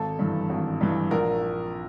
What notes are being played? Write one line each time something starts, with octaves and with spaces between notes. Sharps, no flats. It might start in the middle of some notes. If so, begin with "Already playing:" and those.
Already playing: G#1 A4
G2 E3
G#1
G2 E3
A#1 A#4